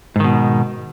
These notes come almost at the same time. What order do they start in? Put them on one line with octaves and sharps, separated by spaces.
G#2 D#3 B2